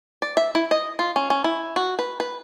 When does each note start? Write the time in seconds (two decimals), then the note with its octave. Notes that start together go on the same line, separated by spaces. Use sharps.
0.22 D5
0.37 E5
0.55 E4
0.71 D#5
0.99 F4
1.16 C#4
1.30 C#4
1.44 E4
1.76 F#4
1.99 B4
2.20 B4